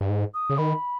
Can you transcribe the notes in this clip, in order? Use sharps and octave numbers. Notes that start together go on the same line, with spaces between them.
G2
G#2
D#6
C#3
D#3 B5